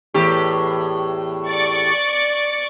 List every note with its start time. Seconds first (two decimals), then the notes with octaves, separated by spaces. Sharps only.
0.14 E2 A2 G4
1.49 D5 C#6 A6